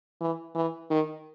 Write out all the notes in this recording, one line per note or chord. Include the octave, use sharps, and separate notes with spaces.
E3
E3
D#3